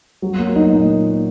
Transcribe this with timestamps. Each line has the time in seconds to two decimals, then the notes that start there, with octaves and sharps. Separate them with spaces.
0.22 F#3
0.38 A#3
0.55 D#4
0.71 A#2